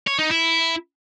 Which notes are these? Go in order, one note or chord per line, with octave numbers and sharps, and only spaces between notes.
C#5
D#4
E4